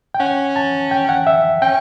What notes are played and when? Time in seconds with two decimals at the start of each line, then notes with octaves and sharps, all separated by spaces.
0.14 G5
0.20 C#4 F#5
0.56 A5
0.91 G5
1.09 F#5
1.27 E5
1.62 C#4 G5